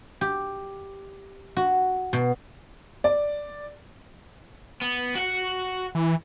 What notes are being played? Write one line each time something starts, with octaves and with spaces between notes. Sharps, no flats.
G4
F#4
B2
D5
B3
F#4 F#5
E3